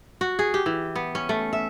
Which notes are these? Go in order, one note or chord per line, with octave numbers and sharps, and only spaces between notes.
F#4
G#4
G4
E3
B3
C#4
A3
E5